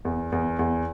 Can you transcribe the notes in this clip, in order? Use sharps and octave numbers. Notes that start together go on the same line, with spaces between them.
E2
E2
E2